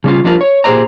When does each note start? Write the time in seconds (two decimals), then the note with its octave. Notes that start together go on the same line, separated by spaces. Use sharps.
0.04 C#3 G3 C#4 F4
0.24 F3 G3 D4 F4 A#4
0.41 C#5
0.64 A#2 G4 G#4 C5 D5 A#5